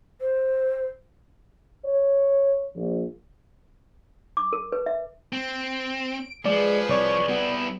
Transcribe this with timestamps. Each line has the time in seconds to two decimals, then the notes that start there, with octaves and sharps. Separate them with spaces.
0.21 C5
1.85 C#5
2.76 A#1
4.37 D6
4.53 A#4
4.72 B4
4.86 E5
5.33 C4 D7
6.45 F3 G#3 G#4 B4 D5
6.89 C2 C#5 D5
7.29 G3 B3 E4